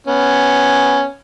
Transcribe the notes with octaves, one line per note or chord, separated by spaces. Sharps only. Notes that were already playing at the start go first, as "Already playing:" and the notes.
B3 C#4